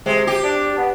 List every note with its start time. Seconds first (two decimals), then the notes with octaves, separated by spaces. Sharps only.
0.06 C3 G#3
0.27 G4
0.44 D4
0.78 B3